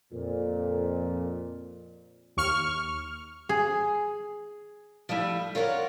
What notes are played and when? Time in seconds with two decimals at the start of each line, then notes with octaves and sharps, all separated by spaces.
0.12 F2 A#2
2.37 D#2 C#6 F6
3.49 G#4
5.09 F3 G3 A3 E4
5.55 F4 A#4 C#5 D5 F5 F#5